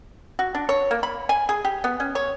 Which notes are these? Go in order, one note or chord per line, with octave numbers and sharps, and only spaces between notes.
F#4
D4
C#5
A#3
B5
G#5
G#4
G4
B3
C#4
C#5